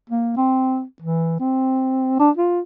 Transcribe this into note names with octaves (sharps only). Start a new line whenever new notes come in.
A#3
C4
E3
C4
D4
F4